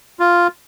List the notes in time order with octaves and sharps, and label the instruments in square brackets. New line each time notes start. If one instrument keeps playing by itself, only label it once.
[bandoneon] F4